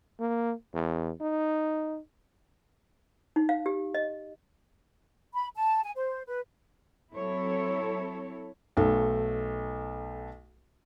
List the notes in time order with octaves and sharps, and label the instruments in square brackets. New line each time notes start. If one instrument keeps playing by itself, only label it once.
[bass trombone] A#3
E2
D#4
[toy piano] D#4
F5
G4
D#5
[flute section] B5
A5
G#5
C5
B4
[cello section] F#3 C4 E4 A4 C#5
[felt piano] B1 A3